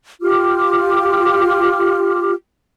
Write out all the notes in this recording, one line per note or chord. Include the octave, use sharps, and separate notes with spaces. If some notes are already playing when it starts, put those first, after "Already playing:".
F4 G4 D6 F6